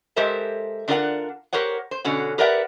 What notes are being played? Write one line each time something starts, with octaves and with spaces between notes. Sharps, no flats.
G#3 G4 A4 A#4 C5 E5
D3 D4 F4 A#4 D5 F#5
G4 A#4 C5 C#5 F#5
C5
B2 D3 C#4 F#4
G4 A#4 B4 D5 E5 F#5